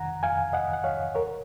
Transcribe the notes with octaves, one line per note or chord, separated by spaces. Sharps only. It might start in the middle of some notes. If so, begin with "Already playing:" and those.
Already playing: F2 D#3 F#5 A#5
F2 F5 G#5
D#5 F#5
D#3 F#5
C#5 F5
D#2 A#4 C#5